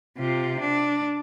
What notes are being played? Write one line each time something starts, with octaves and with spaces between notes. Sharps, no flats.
C3 F4
D4